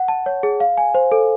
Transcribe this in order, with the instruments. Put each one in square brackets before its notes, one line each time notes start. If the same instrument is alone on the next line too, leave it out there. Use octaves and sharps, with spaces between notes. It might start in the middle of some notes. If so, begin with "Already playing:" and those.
Already playing: [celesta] F#5
A5
C#5
G#4
F5
G#5
C5
A4